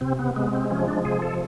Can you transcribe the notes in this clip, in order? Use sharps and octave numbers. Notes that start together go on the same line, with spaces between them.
C3 C4
B3
G#3 B3
C4
F3 C#4
D4
C3 G#4
A4